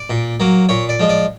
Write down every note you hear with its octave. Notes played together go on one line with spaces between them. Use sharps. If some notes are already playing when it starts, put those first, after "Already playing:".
Already playing: D5
A#2
F#3 A#3
A#2 C#5
D5
F3 G#3
D5